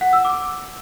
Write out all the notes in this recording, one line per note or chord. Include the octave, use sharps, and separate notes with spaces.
F#5
E6
D6